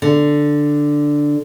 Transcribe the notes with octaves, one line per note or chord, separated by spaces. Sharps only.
D3